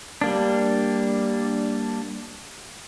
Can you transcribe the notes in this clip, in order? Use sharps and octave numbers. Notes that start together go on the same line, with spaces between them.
G3 A#3 D4